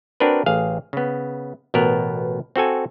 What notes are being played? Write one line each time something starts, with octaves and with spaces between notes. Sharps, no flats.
C4 D4 F#4 A#4 B4
A1 G#4 F5
C#3 B3
A1 B2 B3 A#4
C4 F#4 A4 G#5